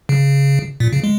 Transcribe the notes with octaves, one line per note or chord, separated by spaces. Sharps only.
C#3
A#2
C#3
G#3